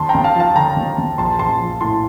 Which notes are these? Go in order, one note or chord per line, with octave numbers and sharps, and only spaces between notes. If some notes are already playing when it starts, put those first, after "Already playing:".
Already playing: D#2 A5 C6
G5 A#5
D#2
F5 A5
F3 F5 A5
D3 G5 A#5
D#2
D#2
A#1 A5 C6
A#1 A5 C6
F3
A2 A5 C6